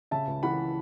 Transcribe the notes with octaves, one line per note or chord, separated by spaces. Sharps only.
C#3 E5 A5
C#2
E3 F#5 B5